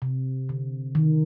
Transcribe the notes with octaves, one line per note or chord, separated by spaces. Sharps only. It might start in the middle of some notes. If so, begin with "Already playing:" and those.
C3
D3
D#3